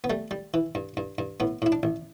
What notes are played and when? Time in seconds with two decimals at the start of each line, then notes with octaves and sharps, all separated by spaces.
0.04 B3
0.10 G3 A3
0.31 G3
0.54 E3
0.75 G2
0.97 G2
1.18 G2
1.40 A2 B3
1.62 A2 E4
1.72 D4
1.83 A1